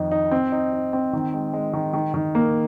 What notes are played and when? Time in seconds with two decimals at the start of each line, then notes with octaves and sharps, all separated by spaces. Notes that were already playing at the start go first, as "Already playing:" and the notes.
Already playing: F2 D#3 D#4
0.11 D#4
0.31 C4
0.52 D#4
0.73 D#4
0.93 C4
1.13 D#3
1.33 G#3
1.53 G#3
1.73 D#3
1.94 D#3
2.14 D#3
2.35 A#3